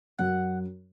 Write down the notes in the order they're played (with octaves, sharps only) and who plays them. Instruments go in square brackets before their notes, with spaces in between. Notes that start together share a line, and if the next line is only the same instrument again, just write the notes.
[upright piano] F#2 [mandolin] F#5